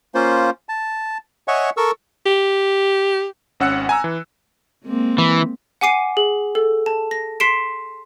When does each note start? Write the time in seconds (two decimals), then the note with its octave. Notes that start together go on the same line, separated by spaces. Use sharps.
0.15 A#3 C#4 F4 C5
0.69 A5
1.48 C#5 D#5 E5 F#5 G#5 C#6
1.77 A4 A#4 C#6 E6
2.26 G4
3.60 G#1 C#4 F#5 E6 F#6 C#7
3.89 G#5 A#5 E6
4.04 E3
4.85 G#3 A#3 C4
5.18 E3
5.81 F#5 G#5 D6 C7 D#7
6.17 G#4
6.55 A4
6.86 A5
7.11 A#6
7.40 C6 B6 C7 D7 E7